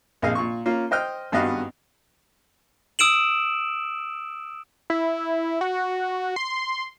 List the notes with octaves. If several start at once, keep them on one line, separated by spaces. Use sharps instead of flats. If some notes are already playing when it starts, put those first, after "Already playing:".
A#1 C3 G#4 D#5 F5
A#2 C#6
A#3 C#4 F4
C5 D#5 G5 F6
G#1 G2 B3 F#4 D#5 F5
D#6 E6 D7 E7 F#7
E4
F#4
C6